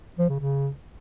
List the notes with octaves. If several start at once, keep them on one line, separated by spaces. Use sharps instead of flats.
F3
C#3
C#3